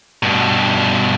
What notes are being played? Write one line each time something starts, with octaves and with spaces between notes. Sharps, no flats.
G2 B2